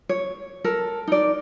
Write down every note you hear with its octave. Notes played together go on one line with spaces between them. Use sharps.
C#5
A4 A#4
D#4 D5